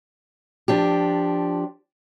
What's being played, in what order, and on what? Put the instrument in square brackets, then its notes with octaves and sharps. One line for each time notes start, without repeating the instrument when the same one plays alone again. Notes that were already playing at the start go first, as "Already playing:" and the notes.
[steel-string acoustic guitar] F3 D4 G4